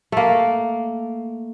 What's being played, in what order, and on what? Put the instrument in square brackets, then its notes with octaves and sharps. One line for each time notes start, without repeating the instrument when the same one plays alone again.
[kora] A3 A#3